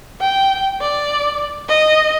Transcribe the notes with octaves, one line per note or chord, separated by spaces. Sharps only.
G5
D5
D#5